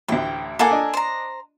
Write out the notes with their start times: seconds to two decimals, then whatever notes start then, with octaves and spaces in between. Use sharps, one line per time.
0.08 A1 D2 G5
0.59 A#3 A4 A#4 F#5 G#5 D6
0.71 D4 D#5
0.94 C5 A#5